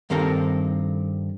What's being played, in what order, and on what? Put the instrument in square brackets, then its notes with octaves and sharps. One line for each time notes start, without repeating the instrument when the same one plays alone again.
[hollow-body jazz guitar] G2 D#3 C4 A4 A#4 F5